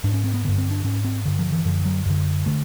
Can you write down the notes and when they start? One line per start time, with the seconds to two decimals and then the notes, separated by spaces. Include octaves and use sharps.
0.04 G#2 D4
0.14 C#4
0.24 C4
0.34 B3
0.44 G2 D3 B3
0.58 C4
0.71 D4
0.84 G#2 C#4
1.05 C4
1.25 G2 D3
1.39 F3
1.52 E3
1.65 F#2 D3 F3
1.86 F#3
2.06 F#2 D3
2.46 D3 A3